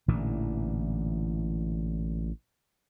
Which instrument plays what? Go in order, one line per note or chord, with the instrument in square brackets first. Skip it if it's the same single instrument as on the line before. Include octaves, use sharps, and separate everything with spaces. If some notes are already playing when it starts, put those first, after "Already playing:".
[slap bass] A1 A#2 D3 E3